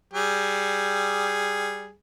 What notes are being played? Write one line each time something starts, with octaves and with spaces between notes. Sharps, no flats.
G3 G#4